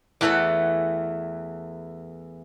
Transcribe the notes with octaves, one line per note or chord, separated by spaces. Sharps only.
E2 E3 A3 A4 F#5